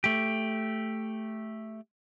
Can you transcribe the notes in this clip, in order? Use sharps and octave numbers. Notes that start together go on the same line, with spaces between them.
A3 G4